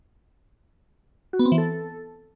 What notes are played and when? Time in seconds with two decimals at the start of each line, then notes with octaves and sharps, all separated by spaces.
1.33 F#4
1.39 B3
1.46 C4
1.52 E3
1.58 A4